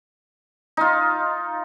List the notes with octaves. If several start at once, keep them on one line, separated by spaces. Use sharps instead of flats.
D#4 F4